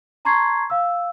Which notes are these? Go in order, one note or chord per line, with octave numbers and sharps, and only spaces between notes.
A5 A#5 C6 C#6 G#6 C7
F5 E6